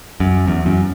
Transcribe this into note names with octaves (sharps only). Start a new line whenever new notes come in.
F#2
E2
F#2